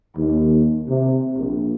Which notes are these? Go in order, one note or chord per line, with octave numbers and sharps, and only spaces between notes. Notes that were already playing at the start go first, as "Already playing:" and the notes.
D#2
C3
A#1